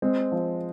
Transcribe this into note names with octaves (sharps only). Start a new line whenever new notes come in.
G#3 C4
F3